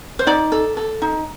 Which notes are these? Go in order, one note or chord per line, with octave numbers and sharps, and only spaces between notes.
C5
D#4 D5
A4
A4
D#4